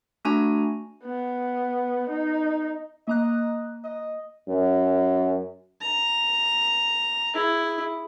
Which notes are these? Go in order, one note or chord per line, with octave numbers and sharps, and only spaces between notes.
A3 D4 F#4 G#5 A#5
B3
D#4
A#3 D#5 A#5 F#6
D#5
F#2
A#5
E4 G#4